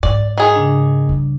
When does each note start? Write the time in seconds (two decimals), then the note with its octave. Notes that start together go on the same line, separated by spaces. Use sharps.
0.03 G#2 D5
0.37 D#3 G#4
0.56 C#3 D4
1.09 G2